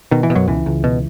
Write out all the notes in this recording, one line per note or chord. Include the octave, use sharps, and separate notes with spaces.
B2 D#3
E3
B2
F#2 F#3
C#2 E3
C#2
B2